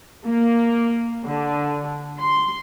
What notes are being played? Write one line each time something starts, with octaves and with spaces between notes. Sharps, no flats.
A#3
D3
C6